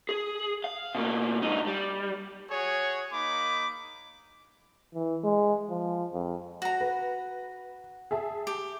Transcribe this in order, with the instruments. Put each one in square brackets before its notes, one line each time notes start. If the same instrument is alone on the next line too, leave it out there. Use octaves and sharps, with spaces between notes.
[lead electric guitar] G#4
F5
B2 A#3
G2 D#4
G3
[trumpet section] F#4 G#4 C#5
A#3 D#4 B5 D6
[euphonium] E3
G#3
F3
F2
[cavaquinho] F#4 A#5
[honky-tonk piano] B4
G#4 E5 A5
[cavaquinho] G4